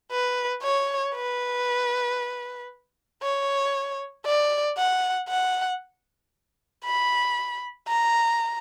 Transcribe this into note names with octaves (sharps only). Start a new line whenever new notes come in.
B4
C#5
B4
C#5
D5
F#5
F#5
B5
A#5